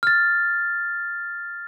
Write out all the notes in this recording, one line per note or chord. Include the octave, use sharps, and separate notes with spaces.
F6 A6